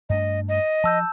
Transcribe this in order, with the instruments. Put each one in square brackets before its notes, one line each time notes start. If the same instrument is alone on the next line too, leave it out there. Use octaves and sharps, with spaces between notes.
[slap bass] G2 A3 D4 [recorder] D#5
[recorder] D#5
[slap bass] F3 [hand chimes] A5 E6 G6